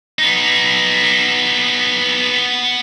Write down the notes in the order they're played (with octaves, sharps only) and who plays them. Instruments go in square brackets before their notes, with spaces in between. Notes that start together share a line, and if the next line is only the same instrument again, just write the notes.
[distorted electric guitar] B3 D#4